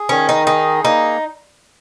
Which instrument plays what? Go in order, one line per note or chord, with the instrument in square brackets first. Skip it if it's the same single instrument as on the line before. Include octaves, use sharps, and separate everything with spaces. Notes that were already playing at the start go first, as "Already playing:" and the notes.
Already playing: [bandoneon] G#4
[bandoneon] D#3 [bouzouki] C#4
[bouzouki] D#4
[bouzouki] D#4 [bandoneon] G#4
[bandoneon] A#3 [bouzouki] D#4